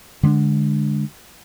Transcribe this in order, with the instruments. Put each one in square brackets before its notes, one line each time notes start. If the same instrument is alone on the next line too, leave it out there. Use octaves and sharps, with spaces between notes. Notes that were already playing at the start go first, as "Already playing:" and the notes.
[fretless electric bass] D3 G#3 B3 D4